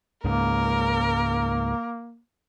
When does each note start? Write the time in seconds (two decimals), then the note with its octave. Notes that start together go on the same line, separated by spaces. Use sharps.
0.24 C#2 G#2 A#3 A#4